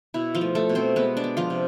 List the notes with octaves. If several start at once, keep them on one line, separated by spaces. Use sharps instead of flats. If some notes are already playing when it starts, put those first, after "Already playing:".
B2 E4
F3 F4
A3
A3 A4
B2
C4 C5
G#3 B3 B4
D4 D5
B3
F3 F4
C3